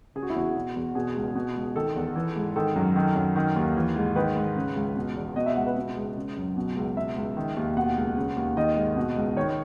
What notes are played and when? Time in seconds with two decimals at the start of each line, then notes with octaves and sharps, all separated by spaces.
0.16 C#3 G#4
0.23 F#4
0.30 E4
0.35 E2 F#4
0.55 B2
0.75 E2
0.95 B2 G#4
1.16 C#2
1.35 B2
1.55 C#2
1.76 D#3 A4
1.96 E2
2.16 E3
2.36 G#2
2.56 D#3 A4
2.75 F#2
2.96 D#3
3.15 F#2
3.36 D#3
3.56 D#2
3.76 E3
3.96 G#2
4.16 D#3 B4
4.36 G#2
4.56 C#3
4.76 C#2
4.97 B2
5.16 E2
5.36 B2 D#5
5.46 E5
5.56 C#2 F#5
5.66 B4
5.77 B2
5.96 C#2
6.17 C#3
6.36 F#2
6.57 B2
6.76 C#2
6.96 B2 E5
7.16 C#2
7.37 D#3
7.56 D#2
7.77 B2 F#5
7.96 C#2
8.17 C#3
8.36 D#2
8.57 D#3 D#5
8.76 G#2
8.97 B2
9.16 C#2
9.36 D#3 C#5